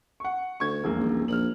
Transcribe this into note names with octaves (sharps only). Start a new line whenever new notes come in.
F#5 C#6
D2 C#6 G#6
E1 A#1 A#3
D#1
A#1 F6 F#7